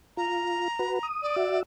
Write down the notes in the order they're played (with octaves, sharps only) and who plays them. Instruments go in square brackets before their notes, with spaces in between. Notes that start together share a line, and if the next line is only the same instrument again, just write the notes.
[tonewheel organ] F4 [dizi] A#5
[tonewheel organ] F#4 B4
D#6
[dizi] D5
[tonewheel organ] F#4 E5